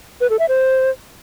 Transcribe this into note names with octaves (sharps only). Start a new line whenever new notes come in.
B4
A4
E5
C5